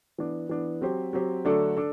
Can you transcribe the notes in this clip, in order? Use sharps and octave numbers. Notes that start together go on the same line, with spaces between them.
E3 B3 D4
E3 B3 D4
F#3 C4 G4 C5
F#3 C4 G4 C5
D3 F#3 A3 D4 A4
D4 A4